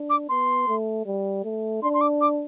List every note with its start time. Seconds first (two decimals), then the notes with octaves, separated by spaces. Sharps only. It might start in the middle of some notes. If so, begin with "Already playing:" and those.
Already playing: D4
0.10 D6
0.29 B3 C6
0.67 A3
1.06 G3
1.44 A3
1.83 D4 C6
1.94 C6
2.01 D6
2.21 D6